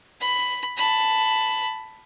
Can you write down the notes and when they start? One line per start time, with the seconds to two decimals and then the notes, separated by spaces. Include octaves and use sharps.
0.21 B5
0.78 A5 B5